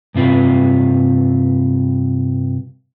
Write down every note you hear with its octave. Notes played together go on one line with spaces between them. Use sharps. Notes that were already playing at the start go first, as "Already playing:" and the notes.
G2 C3 F4 B4